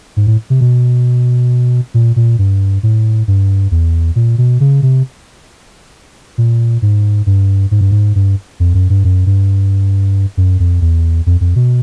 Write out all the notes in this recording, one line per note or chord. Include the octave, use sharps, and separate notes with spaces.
G#2
A2
C3
B2
A#2
A#2
G2
A2
G2
E2
A#2
B2
C#3
C3
A#2
G#2
G2
G#2
G2
G#2
G2
F2
F#2
G2
F#2
G2
F#2
F2
E2
F2
F2
B2